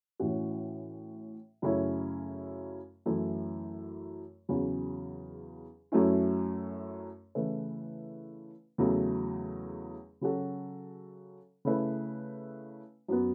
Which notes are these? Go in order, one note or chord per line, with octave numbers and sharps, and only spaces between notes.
A2 E3 C#4 F#4
F#2 C#3 A3 C#4 E4
F#2 E3 A3 E4
E2 C#3 F#3 C#4
F#2 F#3 A3 C#4 E4
C#3 E3 A3 E4 B4
E2 C#3 F#3 A3
C#3 F#3 C#4 F#4 A4
C#3 A3 E4 B4
F#2 F#3 B3